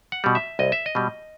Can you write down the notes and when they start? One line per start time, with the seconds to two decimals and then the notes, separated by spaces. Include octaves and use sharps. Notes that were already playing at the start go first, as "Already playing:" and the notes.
0.12 F#5
0.24 B2 G3
0.35 E5
0.59 C2 D#5
0.72 E5
0.86 D#5
0.95 B2 G3